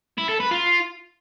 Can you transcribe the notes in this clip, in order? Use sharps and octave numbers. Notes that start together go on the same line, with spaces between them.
E4
A4
B4
F4